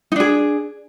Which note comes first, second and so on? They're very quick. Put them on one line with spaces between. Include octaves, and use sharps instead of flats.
D#4 D4 G#4